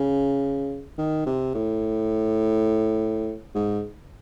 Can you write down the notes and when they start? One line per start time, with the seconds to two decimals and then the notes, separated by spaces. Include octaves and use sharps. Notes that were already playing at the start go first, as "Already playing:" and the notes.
Already playing: C#3
0.98 D#3
1.26 C3
1.54 A2
3.55 G#2